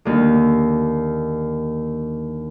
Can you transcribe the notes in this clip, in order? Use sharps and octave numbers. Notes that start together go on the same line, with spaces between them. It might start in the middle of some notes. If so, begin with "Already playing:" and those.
D#2 D3